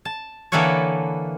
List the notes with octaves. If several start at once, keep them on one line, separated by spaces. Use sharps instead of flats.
A5
D3 E3 A#3 A4 B4 C#5